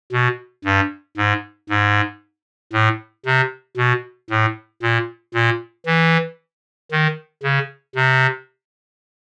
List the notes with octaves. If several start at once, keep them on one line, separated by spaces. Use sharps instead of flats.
B2
G2
G#2
G#2
A2
C3
B2
A2
A#2
A#2
E3
D#3
C#3
C3